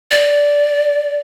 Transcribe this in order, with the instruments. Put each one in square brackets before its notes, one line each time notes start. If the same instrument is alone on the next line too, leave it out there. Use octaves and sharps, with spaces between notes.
[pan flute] D5